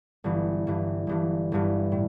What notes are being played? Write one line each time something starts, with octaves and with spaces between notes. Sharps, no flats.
G1 G2 E3
G1 G2 E3
G1 G2 E3
G1 G2 E3
A2